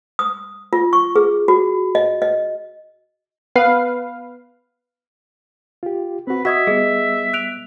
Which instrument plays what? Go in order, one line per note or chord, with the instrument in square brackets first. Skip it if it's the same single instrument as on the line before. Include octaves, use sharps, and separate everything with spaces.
[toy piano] D#6
F4
C#6
G#4
F#4
D#5
D#5
[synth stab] B3 B4 F5
[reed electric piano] F4 G4
[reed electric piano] C4 F#4 [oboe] B4
[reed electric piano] F#4 D#5 [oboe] E5 [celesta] D#6 G#6 B6
[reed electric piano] G3 B3 [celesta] G#4 D#5
[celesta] F#6 D7 F7